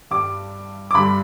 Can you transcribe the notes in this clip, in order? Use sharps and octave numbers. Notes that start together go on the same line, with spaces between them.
G2 G3 D6
D6
G2 D3 G3 B5